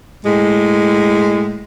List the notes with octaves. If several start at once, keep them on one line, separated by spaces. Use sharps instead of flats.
A2 G#3